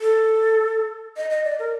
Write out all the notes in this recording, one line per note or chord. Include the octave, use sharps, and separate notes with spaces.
A4
D#5
D#5
D5
A#4